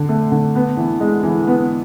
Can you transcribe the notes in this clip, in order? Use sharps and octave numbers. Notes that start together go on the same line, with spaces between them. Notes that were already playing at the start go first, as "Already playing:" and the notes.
Already playing: D3
A3
D3
B3
E3
G#3
E3
B3